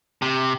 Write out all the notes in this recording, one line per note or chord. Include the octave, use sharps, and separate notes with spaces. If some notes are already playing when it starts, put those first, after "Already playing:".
C3